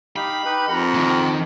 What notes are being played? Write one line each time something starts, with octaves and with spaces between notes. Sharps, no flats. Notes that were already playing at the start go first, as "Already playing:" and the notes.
D#4 G4 F5 B5
D#4 G4 B4
F2 A#4 F#5
D#2 D#3